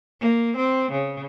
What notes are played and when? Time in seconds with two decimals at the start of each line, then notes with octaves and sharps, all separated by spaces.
0.21 A#3
0.58 C4
0.92 C#3